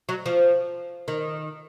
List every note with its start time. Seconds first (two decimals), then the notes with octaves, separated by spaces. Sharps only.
0.09 F#3
0.26 F3
1.08 D#3